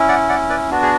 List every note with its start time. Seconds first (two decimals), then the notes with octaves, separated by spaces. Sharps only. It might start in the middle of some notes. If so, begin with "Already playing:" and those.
Already playing: C#4 E4
0.09 D5 F#5
0.29 D5 F#5
0.49 B4 D5
0.71 B3 D4 F#4
0.83 G#4